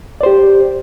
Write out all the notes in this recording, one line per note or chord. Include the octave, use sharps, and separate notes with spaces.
G4 C5 D5